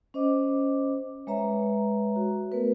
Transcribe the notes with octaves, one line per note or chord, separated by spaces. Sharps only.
C#4 C5 D#5 D6
G#3 B4 C#5 E5 A#5
F#4
A3 B3 A#4 B4